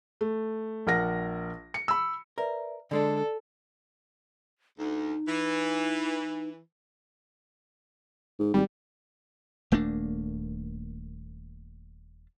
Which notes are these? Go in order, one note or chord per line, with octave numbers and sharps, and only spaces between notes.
A3
A#1 A#4 F#5 A#6
C#7
B5 E6
A#4 B4 D5 E5
D3 G#3 D4 A4 D5
D2 D#4
E3
G#2
G#1 G3
D#1 A3 A#3 D4